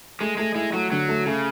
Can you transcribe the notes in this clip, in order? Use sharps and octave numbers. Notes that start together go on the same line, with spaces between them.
G#3 A3
G#3 A3
G#3 E4
F#3 A3
D3 F#3
A3
C#3 A3